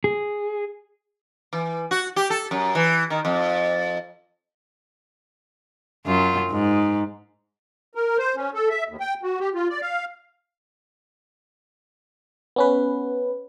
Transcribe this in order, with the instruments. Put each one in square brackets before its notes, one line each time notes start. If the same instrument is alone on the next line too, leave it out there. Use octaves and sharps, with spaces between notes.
[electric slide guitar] G#4
[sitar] E3
F#4
G4
A4
F#2
E3
D#3
F2
[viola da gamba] F#2 F4
G#2
[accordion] A#4
C5
C#4
A4
E5
D#2
G5
F#4
G4
F4
D5
F5
[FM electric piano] B3 C#4 B4